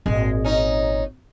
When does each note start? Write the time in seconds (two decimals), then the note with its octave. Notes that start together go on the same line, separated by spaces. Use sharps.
0.06 G#1 A#2 G#3
0.44 C#4 D#4